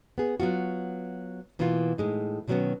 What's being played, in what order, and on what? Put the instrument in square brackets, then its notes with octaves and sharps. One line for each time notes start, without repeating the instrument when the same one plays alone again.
[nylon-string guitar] B3 G#4
F#3 B3 F4 F#4
B2 E3 A#3 B3 F4
A2 G#3 D#4
B2 D#3 F#3 G3 B3 C#4